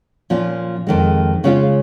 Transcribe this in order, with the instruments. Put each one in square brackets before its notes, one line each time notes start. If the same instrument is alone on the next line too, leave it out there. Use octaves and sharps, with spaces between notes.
[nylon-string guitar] A#2 F3 C#4 F4
F2 D#3 G#3
C#3 G#3 C#4 F4